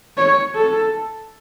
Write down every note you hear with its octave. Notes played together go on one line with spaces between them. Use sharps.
C#5
A4